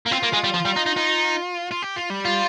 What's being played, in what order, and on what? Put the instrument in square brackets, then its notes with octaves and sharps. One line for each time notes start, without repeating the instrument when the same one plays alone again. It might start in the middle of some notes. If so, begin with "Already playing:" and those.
[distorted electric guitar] A#3
[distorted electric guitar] C4 [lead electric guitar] F4
[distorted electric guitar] A#3
G#3
G3
F3
G3
D#4
D#4
D#4
[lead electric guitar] F4
G4
F4
G3
[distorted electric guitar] F4